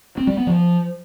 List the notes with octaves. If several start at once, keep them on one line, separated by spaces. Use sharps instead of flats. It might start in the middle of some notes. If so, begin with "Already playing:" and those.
C4
G3
B3
F3